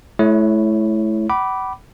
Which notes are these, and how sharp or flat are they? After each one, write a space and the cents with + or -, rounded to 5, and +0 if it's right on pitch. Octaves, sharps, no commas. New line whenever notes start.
A3 -35 E4 +0 C#5 +0
F#5 +45 B5 -5 D6 -5